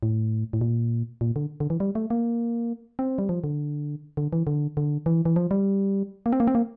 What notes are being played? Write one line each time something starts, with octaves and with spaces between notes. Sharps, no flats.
A2
A2
A#2
A#2
D3
D3
E3
G3
A3
A#3
C4
G3
F3
D3
D3
E3
D3
D3
E3
E3
F3
G3
A#3
C4
A#3
C4
A#3